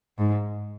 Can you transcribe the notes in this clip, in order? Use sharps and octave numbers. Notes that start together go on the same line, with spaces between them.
G#2